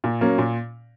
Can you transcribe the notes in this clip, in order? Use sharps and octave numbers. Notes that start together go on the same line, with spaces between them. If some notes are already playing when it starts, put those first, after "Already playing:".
A#2
F#3 A#3 C#4
A#2